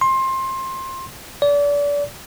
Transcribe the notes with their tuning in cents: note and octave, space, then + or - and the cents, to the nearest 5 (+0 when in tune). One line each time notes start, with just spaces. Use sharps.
C6 +20
D5 -30